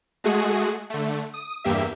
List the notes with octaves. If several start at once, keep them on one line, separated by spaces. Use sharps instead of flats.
G#3 A3 F#4 G#4
D3 A3
D#6
E2 G2 A#3 G4 E5